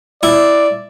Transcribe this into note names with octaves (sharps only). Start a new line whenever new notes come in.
E4 D5